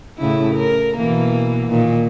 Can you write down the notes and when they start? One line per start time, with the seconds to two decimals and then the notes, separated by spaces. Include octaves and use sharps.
0.18 A2 C#3 E4
0.55 A#4
0.98 B2 E3 A#3
1.67 A#2 D#3